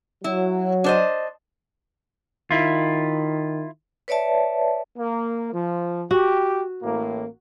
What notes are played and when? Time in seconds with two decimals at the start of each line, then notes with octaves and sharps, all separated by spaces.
0.24 F#3 E4
0.84 D4 C5 D#5
2.51 D#3 E4 F4
4.08 B4 C#5 D5 E5 A5
4.97 A#3
5.53 F3
6.11 F#4 G4
6.83 A1 A2 A#3